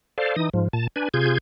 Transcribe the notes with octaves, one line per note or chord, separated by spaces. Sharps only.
A4 C5 D5 F5
E3 D#4 D#6
G#2 F3
A#2 A5
D4 B4 G#5
C3 F4 G#4 G6 G#6